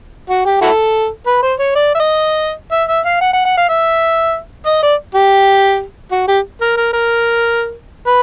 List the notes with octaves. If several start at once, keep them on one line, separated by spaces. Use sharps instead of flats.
F#4
G4
E4 F#4 A4
B4
C5
C#5
D5
E5
D#5
E5
E5
F5
F#5
F#5
F#5
F5
E5
D#5
D5
G4
F#4
G4
A#4
A#4
A#4
B4